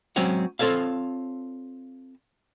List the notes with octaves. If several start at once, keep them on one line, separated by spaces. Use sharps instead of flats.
F#3 G#3 C4 C#4 C#5 F#5
C4 F4 A4 C#5 F5